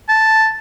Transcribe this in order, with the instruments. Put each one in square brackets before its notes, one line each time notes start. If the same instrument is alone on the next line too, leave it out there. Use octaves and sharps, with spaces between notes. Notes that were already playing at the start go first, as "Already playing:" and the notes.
[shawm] A5